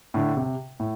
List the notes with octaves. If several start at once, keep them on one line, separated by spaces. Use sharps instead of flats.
A2 D3
C3
A2